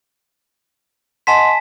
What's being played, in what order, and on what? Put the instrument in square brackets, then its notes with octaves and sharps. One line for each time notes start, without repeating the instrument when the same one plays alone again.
[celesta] D#5 F#5 C6 [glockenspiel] G#5 A5 B6